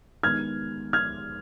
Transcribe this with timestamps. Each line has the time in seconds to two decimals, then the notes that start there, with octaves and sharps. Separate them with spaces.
0.23 D#3 G#3 B3 D#4 F6 G#6
0.93 F6 G#6